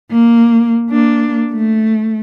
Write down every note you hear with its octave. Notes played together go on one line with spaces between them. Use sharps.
A#3
A#3 D4
A3